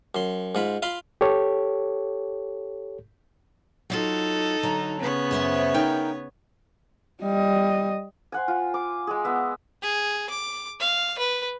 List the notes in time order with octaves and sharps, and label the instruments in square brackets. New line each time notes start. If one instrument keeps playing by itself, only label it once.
[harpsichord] F#2 C6
G#2 F4 B5
F4 F5 B5 C6
[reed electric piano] G4 A4 C#5
[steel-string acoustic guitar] F#3 F4 F#4 [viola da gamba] D#4 A4
[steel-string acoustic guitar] D3 F#3 A#5
[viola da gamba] C#3 B3 C#5
[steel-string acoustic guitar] F#2 C5 E5
D#4 A#4 G5
[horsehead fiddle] G3 D#5
[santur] C5 F#5 G#5
F4
D6
G#3 G#4
B3 E5
[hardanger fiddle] G#4
D6
F5
B4